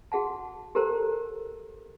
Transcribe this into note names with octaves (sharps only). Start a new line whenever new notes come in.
F#4 G#4 F#5 A5
G4 A4 A#4 C5 A#5